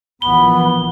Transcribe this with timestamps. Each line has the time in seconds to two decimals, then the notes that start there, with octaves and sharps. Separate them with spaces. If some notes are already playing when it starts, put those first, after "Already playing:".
0.22 A#1 E3 B3 B5 G7